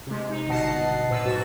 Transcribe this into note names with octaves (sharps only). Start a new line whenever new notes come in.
C3 G#3
D#4
G1 B2 D#5 F#5 A5 C7
A#2 B4 E6
B1 G#2 F#4 A6 E7